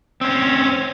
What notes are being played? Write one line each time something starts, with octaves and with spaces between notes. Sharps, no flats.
C4 C#4